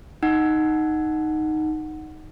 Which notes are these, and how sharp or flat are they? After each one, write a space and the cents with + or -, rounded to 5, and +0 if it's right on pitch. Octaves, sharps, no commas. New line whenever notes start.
D#4 +0 F#5 +0